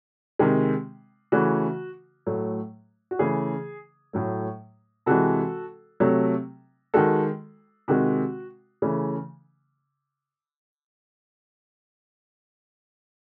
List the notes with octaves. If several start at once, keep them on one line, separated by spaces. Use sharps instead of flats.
C3 D#3 G#3
C#3 E3 A3 F#4
A2 F#3 A3
F#4
C#3 E3 A3 G#4
A2 F#3 A3
C3 E3 G#3 F#4 A4
C3 F#3 A3
D#3 G#3 F#4 A4
C3 D#3 G#3 F#4
C#3 E3 A3